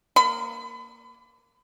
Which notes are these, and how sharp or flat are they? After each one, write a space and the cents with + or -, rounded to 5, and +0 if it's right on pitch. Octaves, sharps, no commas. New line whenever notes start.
A#3 +0 B5 +35